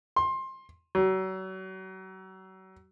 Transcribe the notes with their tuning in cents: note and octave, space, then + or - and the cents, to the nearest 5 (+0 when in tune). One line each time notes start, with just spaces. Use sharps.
C6 +20
F#3 +35